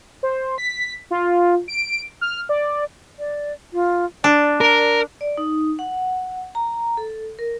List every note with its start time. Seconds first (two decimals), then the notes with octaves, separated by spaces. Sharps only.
0.23 C5
0.58 B6
1.11 F4
1.68 D7
2.21 F6
2.49 D5
3.19 D5
3.73 F4
4.24 D4 D5
4.61 A#4
5.21 D5
5.38 D#4
5.79 F#5
6.55 A#5
6.97 A4
7.39 A#4